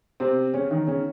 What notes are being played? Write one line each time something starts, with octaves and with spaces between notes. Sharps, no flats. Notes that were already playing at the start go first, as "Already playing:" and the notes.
C3 C4
C#3 C#4
D#3 D#4
C#3 C#4